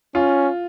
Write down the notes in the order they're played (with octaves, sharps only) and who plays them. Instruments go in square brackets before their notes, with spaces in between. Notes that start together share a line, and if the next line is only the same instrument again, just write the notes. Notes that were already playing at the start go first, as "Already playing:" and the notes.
[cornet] C#4 [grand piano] F4